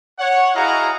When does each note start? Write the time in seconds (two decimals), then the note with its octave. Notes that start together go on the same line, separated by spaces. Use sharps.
0.19 C#5 F#5
0.55 E4 F#4 G#4 D#5 F5 A#5